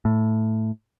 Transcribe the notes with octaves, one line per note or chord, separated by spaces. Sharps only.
A2